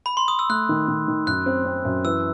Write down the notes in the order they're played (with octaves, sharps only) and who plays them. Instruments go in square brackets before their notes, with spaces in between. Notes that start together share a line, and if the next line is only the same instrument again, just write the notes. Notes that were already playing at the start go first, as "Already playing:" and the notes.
[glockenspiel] B5
C6
D#6
E6
[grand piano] A3 [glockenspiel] F#6
[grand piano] D#3
D#3
D#3
[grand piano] F#2 [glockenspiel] F#6
[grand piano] C4
C4
F#2
[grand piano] E3 [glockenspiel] E6